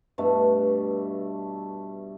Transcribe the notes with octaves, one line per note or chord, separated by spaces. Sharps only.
G2 B2 A3